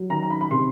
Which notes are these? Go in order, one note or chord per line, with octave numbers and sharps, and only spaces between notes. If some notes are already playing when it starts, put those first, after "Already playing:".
Already playing: F#3
D#3 A#5
A#5
B5
B5
C3 C6